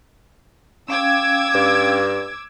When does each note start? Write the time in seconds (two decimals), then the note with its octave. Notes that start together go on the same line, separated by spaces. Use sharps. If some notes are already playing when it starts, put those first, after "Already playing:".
0.88 C#4 F5 G5 D6 E6 G#6
1.54 G2